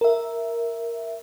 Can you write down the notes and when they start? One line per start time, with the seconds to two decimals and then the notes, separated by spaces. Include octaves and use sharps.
0.01 A#4 E5